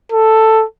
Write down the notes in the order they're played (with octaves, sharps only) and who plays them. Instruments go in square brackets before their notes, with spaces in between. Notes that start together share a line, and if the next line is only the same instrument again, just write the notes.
[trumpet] A4